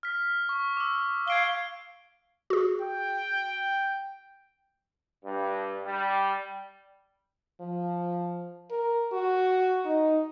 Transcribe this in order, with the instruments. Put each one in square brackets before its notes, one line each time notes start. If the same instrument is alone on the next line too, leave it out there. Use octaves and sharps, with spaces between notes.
[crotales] F6 B6
C#6
D6 E6
[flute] F5 [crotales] G#6 D7 G7
[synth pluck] F#4 G#4
[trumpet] G5
[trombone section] G2
G3
[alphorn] F3
A#4
F#4
D#4